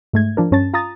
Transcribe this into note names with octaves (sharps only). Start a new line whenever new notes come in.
G#2 A3 G#6
F3 D4 A#4
G2 C#4 A5 A6
F4 A#5 D#6 A6